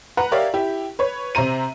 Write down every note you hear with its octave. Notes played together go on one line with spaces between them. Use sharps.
B4 F#5 A#5
G4 A#4 C#5 D5 E5 F5
E4 G4
B4 C#5
C3 C5 A#5 D#7